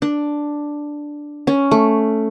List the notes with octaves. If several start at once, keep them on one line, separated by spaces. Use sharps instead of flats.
D4
C#4
A3